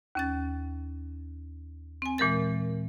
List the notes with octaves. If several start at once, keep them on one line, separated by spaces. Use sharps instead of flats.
D#2 C#4 A6
C4 G#5
A#2 E3 G#3 A#4 A6